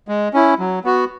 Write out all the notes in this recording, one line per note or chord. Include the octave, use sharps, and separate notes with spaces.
G#3
C#4 E4
F#3
B3 F#4